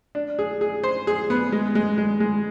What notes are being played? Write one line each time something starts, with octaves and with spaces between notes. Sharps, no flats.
D4
G#4
G#4
C5
G#4
B3
G#3
G#3
G#3
G#3